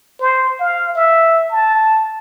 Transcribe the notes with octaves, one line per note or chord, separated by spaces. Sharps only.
C5
F5
E5
A5